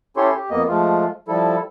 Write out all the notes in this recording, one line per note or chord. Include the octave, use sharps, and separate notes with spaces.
C#4 E4 G4 A4 C#5 C6
G4
F2 A#3 B3 D#5
F3 G#3 A3 F4
F3 G3 E4 A4